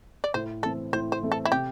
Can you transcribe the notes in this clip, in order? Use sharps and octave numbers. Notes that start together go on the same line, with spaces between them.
D5
A2 C5
E3 A3 C4 A4
A2 C5
C5
E3 A3 C4
A4
E4
C3 G4